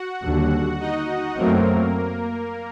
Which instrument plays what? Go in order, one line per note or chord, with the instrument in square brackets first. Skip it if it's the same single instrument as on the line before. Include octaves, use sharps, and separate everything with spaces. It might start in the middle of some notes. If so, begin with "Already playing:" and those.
Already playing: [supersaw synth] F#4 F#5
[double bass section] D#2 D3 G3
[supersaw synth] D#4 D#5
[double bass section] F#2 F#3 A3 C4 [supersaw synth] A#3 A#4